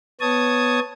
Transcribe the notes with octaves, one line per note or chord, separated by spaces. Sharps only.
B3 C#5 A5 D#6 G#6